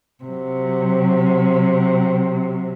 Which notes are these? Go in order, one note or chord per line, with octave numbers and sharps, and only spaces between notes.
C3 F#3